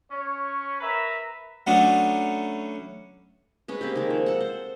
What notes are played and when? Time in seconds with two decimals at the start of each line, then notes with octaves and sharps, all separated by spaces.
0.11 C#4 C#5
0.81 A#4 B4 E5 A#5
1.67 F#3 A3 B3 C#4 D4
3.68 G#3 C#4 B4
3.81 A#3 C4 G4
3.96 D#3 G#3
4.10 F3
4.26 A4 F#5
4.41 C5